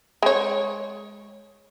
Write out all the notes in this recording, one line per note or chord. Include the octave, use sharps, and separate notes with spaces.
G#3 C#5